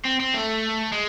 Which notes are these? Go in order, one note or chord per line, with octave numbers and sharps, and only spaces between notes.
C4
C4
A3
G#3